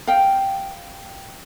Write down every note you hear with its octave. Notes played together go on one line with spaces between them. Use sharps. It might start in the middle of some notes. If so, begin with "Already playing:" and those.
F5 G5